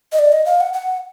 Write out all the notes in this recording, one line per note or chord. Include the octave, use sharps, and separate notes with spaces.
D#5
D5
D#5
F5
F#5
F#5